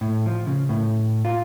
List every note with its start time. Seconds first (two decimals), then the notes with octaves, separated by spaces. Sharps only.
0.01 A2
0.26 F3
0.46 C#3
0.69 A2
1.25 F4